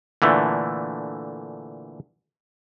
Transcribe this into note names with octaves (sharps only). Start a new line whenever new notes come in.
A#2 D3 E3 A3